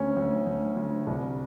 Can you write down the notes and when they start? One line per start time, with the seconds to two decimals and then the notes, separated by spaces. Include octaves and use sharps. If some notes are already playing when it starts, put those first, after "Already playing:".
Already playing: D2 C#4
0.16 D2
0.47 D2
0.76 D2
1.07 C2